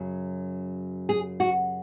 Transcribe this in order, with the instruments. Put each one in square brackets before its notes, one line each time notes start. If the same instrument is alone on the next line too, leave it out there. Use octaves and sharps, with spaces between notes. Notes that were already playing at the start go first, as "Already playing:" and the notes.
Already playing: [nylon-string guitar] F#2 C#3 F#3
G#4
F#4